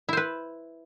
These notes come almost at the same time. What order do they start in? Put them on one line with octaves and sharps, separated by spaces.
E4 C5 B4